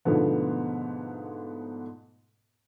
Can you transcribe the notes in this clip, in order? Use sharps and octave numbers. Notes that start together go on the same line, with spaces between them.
G#2 B2 D3 F3 A3 B3